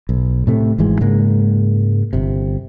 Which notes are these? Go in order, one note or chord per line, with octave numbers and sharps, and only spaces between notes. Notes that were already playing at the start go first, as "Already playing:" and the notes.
B1
A2 C3 A3
G#1 G#2 E3 G#3
G#2 C#3 G#3 A#3
G1 C3